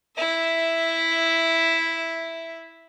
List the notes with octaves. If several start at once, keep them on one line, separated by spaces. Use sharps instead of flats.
E4 E5